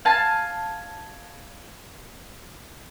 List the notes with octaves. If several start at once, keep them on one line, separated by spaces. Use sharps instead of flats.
F5 G#5 A5